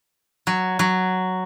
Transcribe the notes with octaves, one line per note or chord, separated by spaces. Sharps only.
F#3
F#3